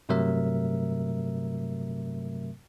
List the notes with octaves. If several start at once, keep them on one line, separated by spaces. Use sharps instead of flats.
G2 C3 F#3 A3 A#4 E5